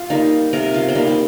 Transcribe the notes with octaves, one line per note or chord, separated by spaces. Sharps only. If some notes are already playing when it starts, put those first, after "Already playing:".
Already playing: F4
G3 A#3 D#4
C3 A#4
F4
C4
G3 A#3 D#4
G4